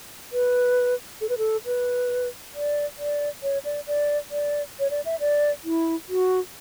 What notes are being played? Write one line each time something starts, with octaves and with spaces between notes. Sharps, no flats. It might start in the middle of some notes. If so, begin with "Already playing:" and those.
B4
A4
B4
A4
B4
D5
D5
C#5
D5
D5
D5
C#5
D5
E5
D5
E4
F#4